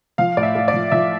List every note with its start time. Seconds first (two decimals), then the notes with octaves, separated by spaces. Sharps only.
0.18 F3 F5
0.37 A2 D5
0.43 E5
0.55 A2
0.68 D5
0.74 F3
0.91 F3 E5